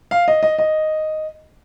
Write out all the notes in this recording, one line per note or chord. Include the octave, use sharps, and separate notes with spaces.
F5
D#5
D#5
D#5